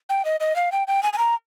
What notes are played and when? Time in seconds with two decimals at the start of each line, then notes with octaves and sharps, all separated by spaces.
0.09 G5
0.25 D#5
0.40 D#5
0.56 F5
0.72 G5
0.88 G5
1.03 G#5
1.13 G#5
1.18 A#5